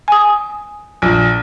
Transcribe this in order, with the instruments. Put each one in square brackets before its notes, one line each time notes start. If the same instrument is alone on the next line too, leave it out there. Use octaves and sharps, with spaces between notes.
[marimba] G#5 D#6
[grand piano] A#1